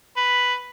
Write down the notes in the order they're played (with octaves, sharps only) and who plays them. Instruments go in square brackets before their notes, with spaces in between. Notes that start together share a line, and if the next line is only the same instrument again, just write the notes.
[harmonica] B4